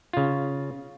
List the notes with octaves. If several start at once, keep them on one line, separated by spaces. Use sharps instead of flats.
C#3 F4